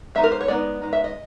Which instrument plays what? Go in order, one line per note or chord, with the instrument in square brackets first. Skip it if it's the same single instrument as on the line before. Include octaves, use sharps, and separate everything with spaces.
[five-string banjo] G#3 B3 D#4 E5
A#4
C5
C#5
G#3 B3 D#4 D5
G#3 B3 D#4
E5
D#5